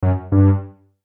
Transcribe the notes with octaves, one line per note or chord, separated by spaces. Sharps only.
F#2
G2